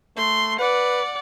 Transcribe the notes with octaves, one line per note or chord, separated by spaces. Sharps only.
A3 C6
B4 D5 F#5